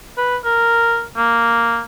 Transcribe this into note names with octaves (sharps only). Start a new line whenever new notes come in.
B4
A#4
A#3